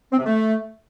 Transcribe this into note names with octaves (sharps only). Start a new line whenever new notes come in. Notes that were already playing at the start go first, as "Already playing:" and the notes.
C4
C3
A3